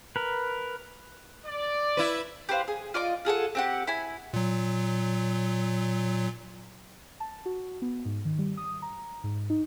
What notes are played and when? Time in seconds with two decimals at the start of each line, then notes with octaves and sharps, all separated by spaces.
0.16 A#4 B4
1.46 D5
1.97 E4 B4
2.49 G4 B4 C5 F5
2.68 G#4
2.94 F4 D5 D#5 D6
3.25 F4 G#4 A4 F#5
3.55 C4 G4 F#5
3.87 E4 G#5
4.34 A#2 F#3
7.20 A5
7.46 F#4
7.82 B3
8.05 G#2
8.25 D#3
8.39 G3
8.57 D#6
8.82 A#5
9.24 G#2
9.50 D#4